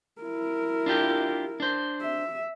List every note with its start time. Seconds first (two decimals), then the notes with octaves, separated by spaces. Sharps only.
0.21 E4 A#4
0.86 D4 F4 G4
1.60 D4 C5
2.01 E5